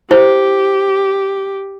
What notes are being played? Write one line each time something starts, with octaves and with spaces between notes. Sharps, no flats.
E4 G4 C5